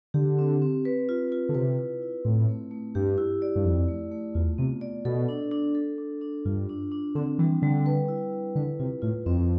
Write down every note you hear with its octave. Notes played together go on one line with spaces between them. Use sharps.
D3 G4
C4
C4
B4
F4
F4
D3
C3 B4
E4
E4
A2 C4
A3
A3
G2 G4
E4
D5
G2
F2 E4
A3
A3
E2 F4
C3 B3
D5
B2 A4
D4
D4
A4
D4
D4
G2 F4
D4
D4
D3 C4
E3 G3
D3 G3
B4
E4
E4
D3 B4
C3 F4
A2 F4
F2 C4